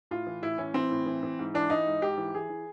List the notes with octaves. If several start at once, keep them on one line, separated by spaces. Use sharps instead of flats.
A2 F4
E3
A2 E4
E3 C#4
E3 C4
A2
E3
E3
G#2
E3 D4
E3 D#4
G#2
G#2 G4
E3
E3 G#4
E3